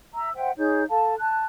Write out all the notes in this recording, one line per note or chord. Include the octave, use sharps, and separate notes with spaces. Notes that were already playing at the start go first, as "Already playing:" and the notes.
E5 A#5 E6
C5 E5 F#5 G5
D#4 G#4 C#5 G6
A4 F5 A5
A5 F#6